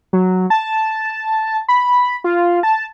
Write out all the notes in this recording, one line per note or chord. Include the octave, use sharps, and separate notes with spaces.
F#3
A5
B5
F4
A5